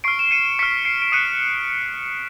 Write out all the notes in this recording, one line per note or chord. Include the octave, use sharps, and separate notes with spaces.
C#6 F6 C7 D7
E7
C#7 D#7
C#6 F6 B6 C#7
C7 D7
D7
D#6 F#6 C#7 D#7